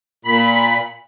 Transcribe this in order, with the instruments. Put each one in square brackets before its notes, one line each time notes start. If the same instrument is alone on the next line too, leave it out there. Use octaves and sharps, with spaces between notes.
[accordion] A#2 B5